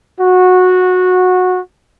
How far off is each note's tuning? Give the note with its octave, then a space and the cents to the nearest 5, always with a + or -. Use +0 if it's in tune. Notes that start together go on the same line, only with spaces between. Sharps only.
F#4 -15